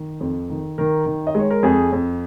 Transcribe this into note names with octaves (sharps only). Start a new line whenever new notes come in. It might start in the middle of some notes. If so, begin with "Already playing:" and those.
Already playing: D#3
F2
D#3
D#3 A#4
D#3
D#5
G#3 C#5
A#4
F2 G#4
F2